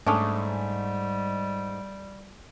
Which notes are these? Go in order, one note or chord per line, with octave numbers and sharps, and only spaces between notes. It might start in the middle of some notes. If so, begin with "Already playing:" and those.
G#2 G3 A3 C#4 D4 D#6